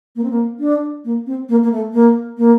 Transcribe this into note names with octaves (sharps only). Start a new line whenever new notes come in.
A#3
C4
A#3
D4
A#3
C4
A#3
A#3
A3
A#3
A#3